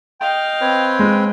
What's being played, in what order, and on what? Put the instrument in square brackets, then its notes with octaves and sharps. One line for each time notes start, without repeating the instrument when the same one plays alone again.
[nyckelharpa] D#5 F5 [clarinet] G5
[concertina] C4 B4 C#5
[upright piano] G#3